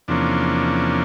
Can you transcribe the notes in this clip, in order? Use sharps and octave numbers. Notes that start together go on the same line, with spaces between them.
E2 C3 F3 A#3 C#4 D4